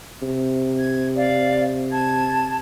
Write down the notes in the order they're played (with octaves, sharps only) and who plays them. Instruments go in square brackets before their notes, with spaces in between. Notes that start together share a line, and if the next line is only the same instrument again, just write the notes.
[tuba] C3
[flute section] G#6
D5 F5
A5 G#6